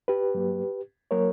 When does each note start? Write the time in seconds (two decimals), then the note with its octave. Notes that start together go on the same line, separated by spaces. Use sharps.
0.08 G4 B4
0.34 G2 F#3 A#3
1.11 F#3 A#3 A#4 C#5